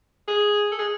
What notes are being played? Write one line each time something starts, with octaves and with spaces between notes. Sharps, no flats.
G#4
A4
G#4